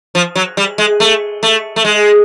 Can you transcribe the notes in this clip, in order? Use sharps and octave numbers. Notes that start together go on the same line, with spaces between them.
F3
F#3
G3
G#3
A3
A3
A3
G#3